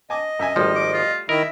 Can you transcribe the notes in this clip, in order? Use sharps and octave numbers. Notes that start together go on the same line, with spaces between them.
D#5 G#5 A5 D6
F#2 E5 G#5
G#1 F3 G3 A3 G4
D6
F4
D#3 E4 A#4 D#5 E5